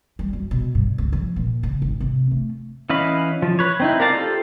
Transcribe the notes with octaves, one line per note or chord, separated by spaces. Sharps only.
G3
F#2
B2
G2
C#2
F3
A#2
C#3
G#1
C3
A3
E3 C#4 D#5 F5 B5
F3
B4 C#5
C4 D#4 E4
A#4 D5 F5 A5 A#5
F4 G4 A4 C5